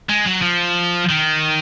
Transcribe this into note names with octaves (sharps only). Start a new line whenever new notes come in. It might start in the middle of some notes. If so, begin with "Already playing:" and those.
G#3
F#3
F3
D#3